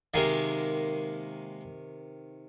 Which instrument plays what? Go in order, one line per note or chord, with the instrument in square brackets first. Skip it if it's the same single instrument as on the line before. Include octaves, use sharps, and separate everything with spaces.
[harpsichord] C3 D#3 G#3 A#3